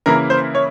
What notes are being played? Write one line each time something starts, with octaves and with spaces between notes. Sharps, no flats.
C#3 E3 A#3 E4 A#4
C5
C#5